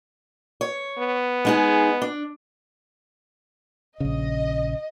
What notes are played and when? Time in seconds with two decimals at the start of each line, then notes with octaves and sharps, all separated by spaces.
0.61 C#5
0.99 B3
1.45 G#3 D#4 G#4
2.02 D4
4.00 A#1 C#3 D#5